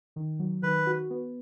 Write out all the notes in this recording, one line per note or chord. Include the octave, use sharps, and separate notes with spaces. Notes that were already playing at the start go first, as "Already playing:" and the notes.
D#3
F#3
D#3 B4
F#4
B3